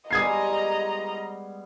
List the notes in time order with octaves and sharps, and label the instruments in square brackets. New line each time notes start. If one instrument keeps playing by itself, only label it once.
[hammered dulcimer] G3 G#3 B3 [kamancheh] D#5 A#5 [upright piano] D#6 G#6 C7